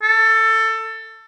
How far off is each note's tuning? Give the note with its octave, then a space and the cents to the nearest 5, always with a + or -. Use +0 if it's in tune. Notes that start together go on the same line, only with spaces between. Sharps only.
A4 +20